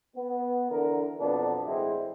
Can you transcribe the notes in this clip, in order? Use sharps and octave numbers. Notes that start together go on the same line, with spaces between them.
B3
D3 E3 A#4
F2 B2 F#3 B3 D4
A2 E3 G#3 C4 E4